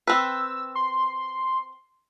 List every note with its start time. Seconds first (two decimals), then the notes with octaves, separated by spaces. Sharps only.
0.07 C4 B4 E6
0.75 C6